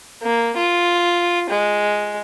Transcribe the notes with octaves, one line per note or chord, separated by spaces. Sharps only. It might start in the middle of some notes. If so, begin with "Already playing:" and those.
A#3
F4
G#3